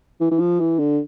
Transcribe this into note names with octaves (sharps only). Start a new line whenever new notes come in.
E3
E3
F3
E3
D3